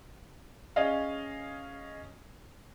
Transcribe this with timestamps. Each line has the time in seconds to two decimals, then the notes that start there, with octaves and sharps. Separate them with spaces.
0.76 C#4 G#4 D#5 F5